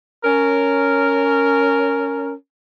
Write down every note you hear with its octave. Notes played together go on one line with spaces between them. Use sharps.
C#4 A#4